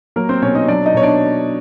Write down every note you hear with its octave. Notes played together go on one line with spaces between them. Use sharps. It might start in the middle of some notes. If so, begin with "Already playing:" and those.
F#3 A#3 A#4
C4 C5
B2 C#4 C#5
D#4 D#5
F#3 D4 D5
D#4 D#5
B2 C#5
D4 D5